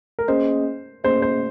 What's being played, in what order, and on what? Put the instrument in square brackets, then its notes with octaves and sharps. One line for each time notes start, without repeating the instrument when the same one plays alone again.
[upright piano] A#4
[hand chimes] A#3 C#4 G#4 D#5 [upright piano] C5
[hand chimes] A#3 C#4 G#4 D#5 [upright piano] C5
[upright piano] C5